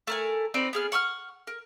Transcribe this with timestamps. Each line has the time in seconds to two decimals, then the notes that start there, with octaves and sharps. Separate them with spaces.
0.07 A3 A#4 G#5
0.54 C4 D#4 B4 D5
0.73 B3 G#4 F6
0.92 F#5 C#6 E6 F6
1.47 A#4